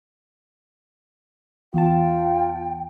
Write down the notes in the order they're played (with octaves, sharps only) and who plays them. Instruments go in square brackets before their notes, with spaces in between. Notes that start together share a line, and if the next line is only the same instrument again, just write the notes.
[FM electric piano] E2 A5 [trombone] F4 [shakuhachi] G5